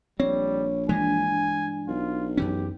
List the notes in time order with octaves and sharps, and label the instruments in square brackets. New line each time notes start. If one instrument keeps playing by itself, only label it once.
[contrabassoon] A#1 [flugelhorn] G3 [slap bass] C4 [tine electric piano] C#5
[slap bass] G2 E3 G#3 [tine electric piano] D4 [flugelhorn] G#5
[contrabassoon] B1 [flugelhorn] F4
[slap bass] F#2 E3 C#4 [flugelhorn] G4